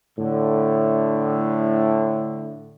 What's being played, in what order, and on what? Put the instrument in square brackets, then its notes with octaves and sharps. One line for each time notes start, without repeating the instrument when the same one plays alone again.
[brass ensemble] A2 D3